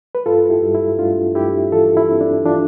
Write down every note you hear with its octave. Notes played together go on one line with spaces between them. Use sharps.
B4
G2 F4 A4
E4 G4
G2
E4
G2 D4 F4
G2 E4 G4
E3 F4 A4
E4
C4
D4
E3 D4 F4